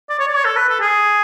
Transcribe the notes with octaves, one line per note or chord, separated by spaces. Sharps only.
D5
C#5
D5
C#5
A4
B4
A4
G#4